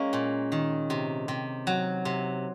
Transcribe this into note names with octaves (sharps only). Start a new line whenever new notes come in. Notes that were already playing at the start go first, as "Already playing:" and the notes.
Already playing: G#3 A#3 C#4
A#2
D#3
C3
C3
F#3
C3